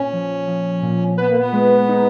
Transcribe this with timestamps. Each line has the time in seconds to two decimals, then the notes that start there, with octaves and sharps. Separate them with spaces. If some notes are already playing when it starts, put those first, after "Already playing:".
Already playing: A#2 C#4
0.13 F3
0.48 F3
0.82 A#2
1.18 B3 B4
1.27 A#3
1.36 B3
1.53 G#3
1.89 D#4